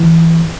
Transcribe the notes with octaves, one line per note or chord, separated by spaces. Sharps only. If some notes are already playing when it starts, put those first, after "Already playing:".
Already playing: E3